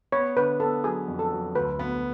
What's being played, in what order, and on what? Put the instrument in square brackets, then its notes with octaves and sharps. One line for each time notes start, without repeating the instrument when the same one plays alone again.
[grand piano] B3 [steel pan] C#5
[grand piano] D3 [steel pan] B4
[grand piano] B3 [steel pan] A4
[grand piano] F#3 [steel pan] G#4
[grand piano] F2
[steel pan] A4
[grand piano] F#3
[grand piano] D2 [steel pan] B4
[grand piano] B3